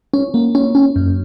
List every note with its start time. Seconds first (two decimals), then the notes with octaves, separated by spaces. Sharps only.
0.14 C#4
0.34 A#3
0.55 C#4
0.75 C#4
0.96 F#2